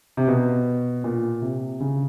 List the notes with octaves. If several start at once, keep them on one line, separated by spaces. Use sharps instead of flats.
C3
B2
A#2
C3
C#3